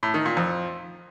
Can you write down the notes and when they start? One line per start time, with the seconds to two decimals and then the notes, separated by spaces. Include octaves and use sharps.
0.03 A2
0.14 D#3
0.25 A#2
0.37 F2